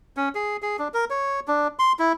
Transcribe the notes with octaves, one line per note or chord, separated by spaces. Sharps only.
C#4
G#4
G#4
D4
A#4
C#5
D4
C6
E4